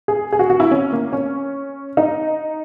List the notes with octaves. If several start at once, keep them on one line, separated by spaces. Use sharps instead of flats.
G#4
G#4
F#4
F#4
E4
C#4
A#3
C#4
D#4